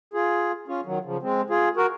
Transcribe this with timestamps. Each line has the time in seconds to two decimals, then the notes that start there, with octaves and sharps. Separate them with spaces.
0.13 F4 G#4
0.68 C#4 F4
0.86 D#3 F#3
1.05 C#3 F3
1.22 G#3 C4
1.50 F4 G#4
1.77 F#4 A#4